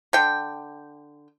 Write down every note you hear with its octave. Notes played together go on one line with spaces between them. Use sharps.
D3 G5